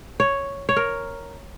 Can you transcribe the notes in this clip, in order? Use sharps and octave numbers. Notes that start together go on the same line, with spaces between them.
C#5
C#5
A#4